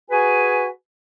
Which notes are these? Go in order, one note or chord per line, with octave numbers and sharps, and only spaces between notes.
F#4 G#4 B4 G#5